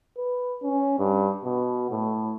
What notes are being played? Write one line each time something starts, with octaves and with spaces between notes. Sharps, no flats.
B4
C#4
G2
B2
A2